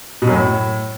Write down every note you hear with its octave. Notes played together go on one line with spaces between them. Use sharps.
B2
F#2
A2